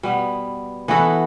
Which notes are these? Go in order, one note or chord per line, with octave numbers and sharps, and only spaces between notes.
B2 G3 B3
E3 B3 F#4 A4